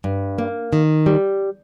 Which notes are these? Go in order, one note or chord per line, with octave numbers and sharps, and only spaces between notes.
G2
A#3
D#3
G3